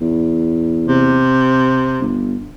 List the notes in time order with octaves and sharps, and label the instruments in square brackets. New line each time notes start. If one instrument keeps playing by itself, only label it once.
[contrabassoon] E2
[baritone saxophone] C3
[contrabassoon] G1